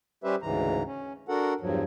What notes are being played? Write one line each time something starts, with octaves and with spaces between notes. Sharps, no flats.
G3 C#4 G4 B4 C5 E5
D2 G#2 C#3 E3 A#5
C#4
D4 F#4 A4 A#4 F#5
E2 G2 F3 F#3